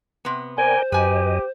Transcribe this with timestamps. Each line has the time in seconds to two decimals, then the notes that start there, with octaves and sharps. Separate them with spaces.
0.25 C3 B3
0.58 A#4 C5 D5 G5 G#5
0.92 F#2 G4 B4 D#5 G#5